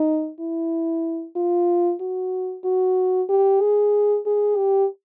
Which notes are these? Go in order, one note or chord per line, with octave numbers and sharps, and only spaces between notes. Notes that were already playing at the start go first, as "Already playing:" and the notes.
Already playing: D#4
E4
F4
F#4
F#4
G4
G#4
G#4
G4